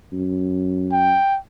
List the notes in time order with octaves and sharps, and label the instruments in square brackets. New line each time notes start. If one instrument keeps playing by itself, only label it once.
[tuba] F#2
[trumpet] G5